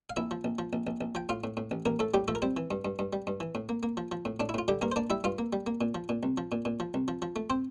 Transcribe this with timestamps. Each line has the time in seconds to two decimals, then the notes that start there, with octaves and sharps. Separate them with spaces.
0.10 F5
0.16 A#1 E4 E5
0.31 F3
0.44 A#1
0.59 F3
0.73 A#1
0.87 A#1
1.01 A#1
1.15 F3 G5
1.29 A2 F4 F5
1.44 A2
1.57 A2
1.71 A1
1.85 A1 A#3 A#4
1.99 A2 A3 A4
2.14 A2 G3 G4
2.28 F3 A3 A4
2.35 A#4
2.42 G3 C4 C5
2.57 E3
2.71 G2
2.85 G2
2.99 G2
3.13 G3
3.27 G2
3.40 E3
3.55 A2
3.69 A#3
3.83 A#3
3.97 F3
4.12 F3
4.25 A2
4.40 A2 D4
4.49 E4
4.54 A2 F4
4.68 D3 G3 G4
4.82 G2 A#3 A#4
4.92 C5
4.96 A#3 D4 D5
5.10 G3 E4 E5
5.24 G2 F4 F5
5.39 A#3
5.53 G3
5.67 A#3
5.81 A#2
5.95 F3
6.09 A#2
6.23 C2
6.38 F3
6.52 A#2
6.65 A#2
6.80 F3
6.94 C2
7.08 F3
7.22 F3
7.36 A3
7.50 C4 C5